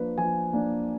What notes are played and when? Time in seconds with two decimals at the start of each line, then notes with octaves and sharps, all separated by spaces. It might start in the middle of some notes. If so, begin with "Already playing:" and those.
Already playing: F3 A#3 D4 B4
0.18 F3 G#5
0.53 A#3 D4